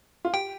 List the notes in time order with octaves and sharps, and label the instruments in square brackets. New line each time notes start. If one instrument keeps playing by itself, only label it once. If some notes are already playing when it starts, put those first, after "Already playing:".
[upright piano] F4
[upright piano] G4 [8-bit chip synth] G5